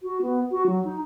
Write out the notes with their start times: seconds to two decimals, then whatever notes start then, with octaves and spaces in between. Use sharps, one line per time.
0.03 F#4
0.22 B3
0.51 F#4
0.67 F#3
0.84 D#4